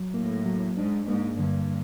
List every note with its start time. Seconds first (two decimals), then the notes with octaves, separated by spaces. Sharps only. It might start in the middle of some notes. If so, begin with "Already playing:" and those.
Already playing: F#3
0.14 A2 A#3
0.46 F#3
0.76 G#2 D4
1.08 G#2 A#3
1.39 G2 D3